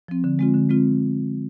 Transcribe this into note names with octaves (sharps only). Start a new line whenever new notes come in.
F3 C4
D3
G#3 C4 F4
D3
G#3 C4 F4